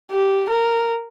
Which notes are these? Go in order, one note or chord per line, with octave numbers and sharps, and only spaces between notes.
G4
A#4